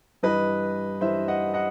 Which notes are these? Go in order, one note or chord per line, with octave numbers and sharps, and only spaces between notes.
G2 E3 B4 D#5
G2 E3 C5 E5
D#5 F#5
D#5 F#5